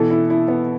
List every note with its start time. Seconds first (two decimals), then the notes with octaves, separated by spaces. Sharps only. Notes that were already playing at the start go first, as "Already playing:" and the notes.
Already playing: B2 E3 A4
0.10 E4
0.30 E4
0.48 B3